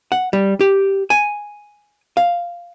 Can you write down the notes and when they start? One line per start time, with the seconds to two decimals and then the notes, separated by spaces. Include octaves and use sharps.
0.12 F#5
0.33 G3
0.61 G4
1.10 G#5
2.17 F5